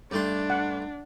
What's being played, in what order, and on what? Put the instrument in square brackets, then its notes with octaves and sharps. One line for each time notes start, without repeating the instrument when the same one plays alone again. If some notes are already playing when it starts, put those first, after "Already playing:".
[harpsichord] G2 A3 C6 [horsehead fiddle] D4
[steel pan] F#5